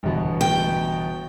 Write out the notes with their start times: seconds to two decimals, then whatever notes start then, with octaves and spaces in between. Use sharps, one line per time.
0.03 G1 E2 B2
0.41 G5